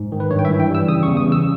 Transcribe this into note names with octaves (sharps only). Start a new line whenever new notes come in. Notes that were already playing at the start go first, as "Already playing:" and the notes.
Already playing: G#2
D#3
B4
G2 C#5
G5
E5
E3
G5
G3 E6
C#3 D#6
C#6
E2
D#6
C#3 E6